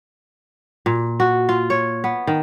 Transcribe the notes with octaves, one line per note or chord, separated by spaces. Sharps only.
A#2
F#4
F4
C#5
B3
D#3